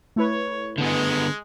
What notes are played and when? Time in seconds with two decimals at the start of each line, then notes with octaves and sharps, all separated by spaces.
0.16 A3 E4 B4 C#5
0.78 D3 G#3 B3